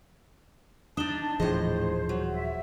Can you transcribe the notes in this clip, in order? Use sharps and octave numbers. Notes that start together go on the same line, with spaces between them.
D4 D#4 A5 D#6 E7 G7
D#1 A2 E3 F3 G#4 C5 D#5
F#3
E5